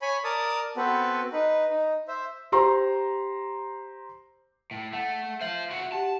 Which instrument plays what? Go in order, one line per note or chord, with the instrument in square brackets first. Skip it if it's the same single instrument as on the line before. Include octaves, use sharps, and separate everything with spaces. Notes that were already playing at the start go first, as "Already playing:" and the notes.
[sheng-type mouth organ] C#5 G#5 B5
A#4 D5 A5 D#6
B3 C4 F#4 A4 B4
D#4 B4
D#4
C5 E5
[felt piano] G4 C5 A#5 C6
[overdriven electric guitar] A2
[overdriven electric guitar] A3 [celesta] F#5
[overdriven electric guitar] C5 F5 [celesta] E5 F#7
[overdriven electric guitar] E4 F#4
[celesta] G4 F#5 [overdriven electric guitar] A5